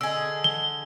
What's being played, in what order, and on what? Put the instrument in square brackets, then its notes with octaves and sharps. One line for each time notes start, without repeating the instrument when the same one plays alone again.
[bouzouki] D3 G#4 [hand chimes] D#5 D7 [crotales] E6
[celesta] G7